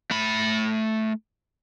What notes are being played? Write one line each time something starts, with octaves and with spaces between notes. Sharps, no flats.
A3 B5